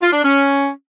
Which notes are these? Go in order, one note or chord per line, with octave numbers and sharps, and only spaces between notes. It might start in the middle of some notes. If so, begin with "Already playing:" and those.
F4
D4
C#4